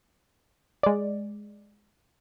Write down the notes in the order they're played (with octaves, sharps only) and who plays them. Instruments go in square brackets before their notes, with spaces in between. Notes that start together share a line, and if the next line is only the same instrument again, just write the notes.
[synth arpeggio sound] G#3 D5